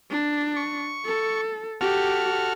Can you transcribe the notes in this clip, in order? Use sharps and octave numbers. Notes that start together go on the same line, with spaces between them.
D4
C#6
A4
F#4 G4 A4 F6